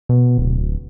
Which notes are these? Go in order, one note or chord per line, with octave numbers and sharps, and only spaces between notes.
B2
D1